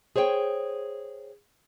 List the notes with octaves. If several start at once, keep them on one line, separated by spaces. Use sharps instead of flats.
G#4 C5 C#5 F5 G5